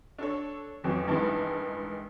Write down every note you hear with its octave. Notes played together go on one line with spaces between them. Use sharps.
D4 A4 C#5
A1 F2 F#3 C#4
A1 G2 D#3 G#3 E4 A5